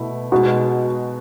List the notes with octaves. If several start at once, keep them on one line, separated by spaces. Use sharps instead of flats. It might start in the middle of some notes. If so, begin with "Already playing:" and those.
Already playing: B2 A3 E4
B2 G#3 D#4 F#4